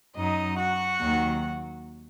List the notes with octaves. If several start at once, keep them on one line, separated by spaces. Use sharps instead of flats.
F#2 F#3 D#4 D#5
F#4 F#5
D#2 D#3 F#3